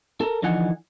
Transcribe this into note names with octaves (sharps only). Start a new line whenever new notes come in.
A4 A#4
D3 E3 F3 D#4 F#5 G#5